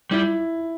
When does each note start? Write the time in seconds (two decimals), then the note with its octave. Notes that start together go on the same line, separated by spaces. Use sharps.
0.11 G3 E4